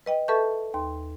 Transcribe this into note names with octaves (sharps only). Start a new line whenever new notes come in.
B4 D#5 G5
A4 B4 E5 A5 C#6 G6
D#2 C6